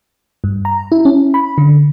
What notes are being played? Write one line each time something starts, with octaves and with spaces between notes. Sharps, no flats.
G2
A#5
E4
C#4
B5
D3